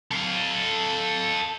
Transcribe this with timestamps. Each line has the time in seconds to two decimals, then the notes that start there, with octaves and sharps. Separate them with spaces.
0.11 A4 F5